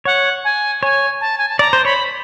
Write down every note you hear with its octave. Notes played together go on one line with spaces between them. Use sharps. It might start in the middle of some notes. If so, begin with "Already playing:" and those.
C#5 F#5
G#5
C#5 G#5
A5
G#5
A5
D5 A#5
C5
C#5 B5